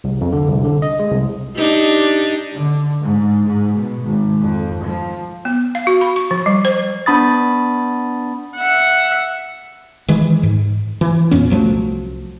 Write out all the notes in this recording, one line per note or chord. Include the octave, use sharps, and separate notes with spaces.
C2
F2
D3
C2
D3
D#5
G#3
C2
D4 D#4 G4
D3
G#2
G#2
B2
G#1
F2
F3
B3
F5
F#4
B5
C#6
F3
G3
C5
B3 D4 B5 D#6 A6
E5 F#5
D#3 E3 G#3
G#2
E3
F2 A#2 B3 C#4
C2 F3 F#3 A3